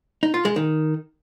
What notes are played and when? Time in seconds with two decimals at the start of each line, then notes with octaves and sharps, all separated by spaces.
0.23 D#4
0.34 F4
0.45 G#3
0.56 D#3